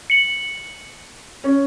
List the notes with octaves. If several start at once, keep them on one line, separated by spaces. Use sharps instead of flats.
C#7 F#7
C#4